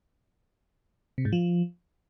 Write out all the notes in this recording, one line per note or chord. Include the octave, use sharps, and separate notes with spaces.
C3
G#2
F3